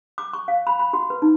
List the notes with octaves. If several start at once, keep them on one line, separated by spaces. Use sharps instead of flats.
D6
C#6
F5
B5
B5
F#4
B4
D#4